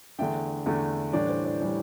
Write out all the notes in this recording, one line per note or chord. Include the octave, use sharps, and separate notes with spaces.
E2 D3 A3 D4 E5 G5
E2 D3 A3 D4
A2 E3 G3 D4 D5
C5
D5
A2 E3 G3 D4 D5